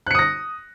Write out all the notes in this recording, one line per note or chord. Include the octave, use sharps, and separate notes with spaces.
D#6 F#6 A#6 C#7